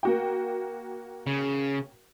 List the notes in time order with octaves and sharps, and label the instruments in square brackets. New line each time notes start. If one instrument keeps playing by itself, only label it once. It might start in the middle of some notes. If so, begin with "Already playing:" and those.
[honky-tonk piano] A#3 F#4 G5
[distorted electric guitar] C#3